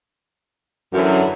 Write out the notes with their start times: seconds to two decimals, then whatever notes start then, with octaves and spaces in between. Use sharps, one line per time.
0.93 F#2 D3 E3 F#3